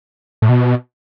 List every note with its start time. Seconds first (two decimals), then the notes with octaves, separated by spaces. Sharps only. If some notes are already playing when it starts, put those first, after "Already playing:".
0.42 A2
0.49 B2